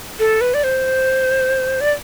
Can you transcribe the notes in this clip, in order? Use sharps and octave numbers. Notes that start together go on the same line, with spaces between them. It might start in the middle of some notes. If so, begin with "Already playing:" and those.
A4
B4
D5
C5
D5